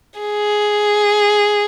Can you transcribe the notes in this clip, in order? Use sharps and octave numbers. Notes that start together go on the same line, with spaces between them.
G#4